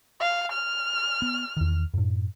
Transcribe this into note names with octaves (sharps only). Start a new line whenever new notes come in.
F5
F6
B3
E2 D#3
F#2 A2